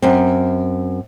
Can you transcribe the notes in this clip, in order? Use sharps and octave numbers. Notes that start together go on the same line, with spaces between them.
F#2 C4